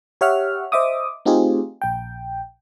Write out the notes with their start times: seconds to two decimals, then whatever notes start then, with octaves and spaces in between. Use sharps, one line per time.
0.21 G4 C#5 E5 F#5 F6
0.72 C5 D#5 E5 D6 D#6
1.25 A3 C4 D#4 F4 G4 G#4
1.82 A#1 G5